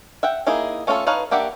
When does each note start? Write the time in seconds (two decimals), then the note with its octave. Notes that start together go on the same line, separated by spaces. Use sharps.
0.23 E5 F#5 G5
0.47 A#3 D#4 E4 G#4
0.87 A3 C#4 D4 F4 A4
1.07 D#4 B4 C#5 F5 A5
1.31 A#3 D4 G4 E5 F#5